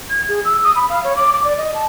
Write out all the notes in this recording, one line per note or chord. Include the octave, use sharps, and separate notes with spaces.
G#6
G#4
E6
D#6
B5
F5
C#5
D6
D6
D5
D#5
A5